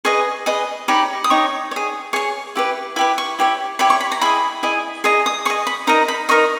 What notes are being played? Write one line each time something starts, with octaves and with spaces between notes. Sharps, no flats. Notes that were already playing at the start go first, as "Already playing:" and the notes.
G#4 B4 D#5 C#6
G#4 B4 D#5
D#4 G4 C#5 B5
D#6
D#4 G4 C#5 C#6
G#4 C#5
G#4 C#5 C#6
E4 G4 B4
E4 G4 B4 B5
C#6
E4 G4 C#5
E4 G4 C#5 B5
C#6
B5
A#5
E4 G#4 D#5 B5
E4 G#4 D#5
G#4 D#5 A#5
D#6
G#4 D#5 C#6
B5
D#4 A#4 D#5 A#5
B5
D#4 A#4 D#5 C#6